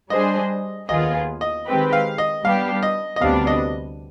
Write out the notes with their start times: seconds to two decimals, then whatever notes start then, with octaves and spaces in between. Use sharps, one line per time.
0.10 G3 D4 G#4 C5 D#5
0.88 D#2 D#3 B3 F4 G#4 D#5
1.41 D#5
1.66 D#3 G#3 C4 G4 B4
1.93 F5
2.18 D#5
2.44 G3 B3 D4 G4 F5
2.83 D#5
3.16 D#5
3.21 D2 C3 G3 B3 D4 F5
3.47 D#5